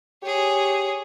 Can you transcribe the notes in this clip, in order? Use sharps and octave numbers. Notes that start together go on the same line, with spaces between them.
G4 G#4 C#5